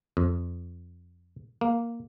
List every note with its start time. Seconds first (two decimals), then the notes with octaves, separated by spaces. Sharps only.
0.17 F2
1.61 A#3